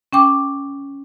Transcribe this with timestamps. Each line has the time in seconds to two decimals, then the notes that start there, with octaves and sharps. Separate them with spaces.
0.13 C#4 G5 D6